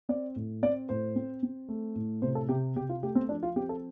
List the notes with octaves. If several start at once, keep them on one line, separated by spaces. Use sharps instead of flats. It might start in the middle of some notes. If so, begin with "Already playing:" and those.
C4 D5
A2
C4 D5
A2 C5
C4
C4
A3
A2
C3 C5
A4
C3 G4
C3 G4
F4
A3 G4
C4
F3 D4
F4
C4 G4
A4